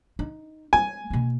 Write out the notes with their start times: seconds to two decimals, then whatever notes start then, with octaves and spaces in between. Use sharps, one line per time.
0.19 D#4
0.73 G#3 G#5
1.10 B2 A#3